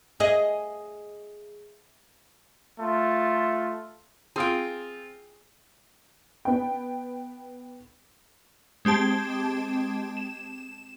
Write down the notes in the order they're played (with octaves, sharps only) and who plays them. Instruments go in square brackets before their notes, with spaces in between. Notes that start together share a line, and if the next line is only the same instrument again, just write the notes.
[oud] G#4 D#5
[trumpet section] A3 F4
[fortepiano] C4 F4 [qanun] G#4 G5
[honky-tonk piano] B3 G5
[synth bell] G#3 C4 G4 A5 G#6
E7